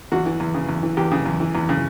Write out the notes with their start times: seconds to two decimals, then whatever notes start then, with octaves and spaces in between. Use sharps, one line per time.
0.12 E2 F#4
0.26 E3
0.40 E2
0.54 C#3
0.69 E2
0.83 E3
0.97 E2 G4
1.12 C#3
1.26 E2
1.40 E3
1.55 E2
1.69 C#3